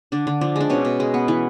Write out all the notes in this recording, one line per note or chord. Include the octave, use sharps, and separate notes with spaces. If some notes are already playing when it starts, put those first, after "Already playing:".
D3 D4
D3
F3 D4
G#3 D4
B2 C#4
B2
G#3
B3
E3